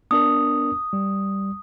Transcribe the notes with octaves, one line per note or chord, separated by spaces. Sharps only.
B3 D4 A#4 D#6
G3